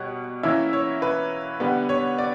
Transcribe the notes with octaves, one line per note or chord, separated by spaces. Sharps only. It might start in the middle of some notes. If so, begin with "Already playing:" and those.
Already playing: B2 G3 C#5 F#5
E3 A#3 C#4 E4 E5
C#5
B4
D3 G3 B3 B4
C#5
D5